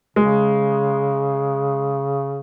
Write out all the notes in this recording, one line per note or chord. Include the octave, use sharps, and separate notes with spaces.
C#3 G#3